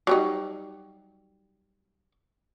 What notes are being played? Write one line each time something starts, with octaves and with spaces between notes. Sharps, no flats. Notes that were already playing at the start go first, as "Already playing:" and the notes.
F#3 G3 D#4